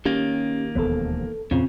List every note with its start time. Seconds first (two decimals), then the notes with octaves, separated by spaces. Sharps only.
0.05 D#3 A#3 C#4 G4
0.75 E1 D#2 F3 B3 A4
1.51 E2 A#2 C#3 C4 C#4 F4